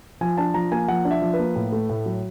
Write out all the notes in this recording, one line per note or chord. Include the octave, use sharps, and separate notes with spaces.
F3 G#5
D4 A5
F3 A#5
A#3 G#5
F3 F#5
D4
E5
F3
B4
A#3
A2
A3
A2
F#3